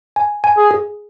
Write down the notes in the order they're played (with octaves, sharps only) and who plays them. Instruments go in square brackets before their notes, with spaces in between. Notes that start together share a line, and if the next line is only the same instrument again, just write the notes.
[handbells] G#5
G#5
[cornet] G#4
[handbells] G#4